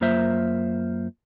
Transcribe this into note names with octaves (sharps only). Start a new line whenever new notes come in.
F#2 A#3 F4 C5 E5